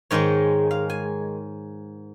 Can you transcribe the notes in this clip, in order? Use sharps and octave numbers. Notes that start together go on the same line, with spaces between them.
G#2 D#3 G#3 C#5
F5
G#5